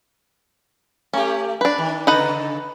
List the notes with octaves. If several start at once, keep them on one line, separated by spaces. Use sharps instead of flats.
A3 C#4 G4
D4 B4
D#3
C#3 D#4 A4 B4 A#5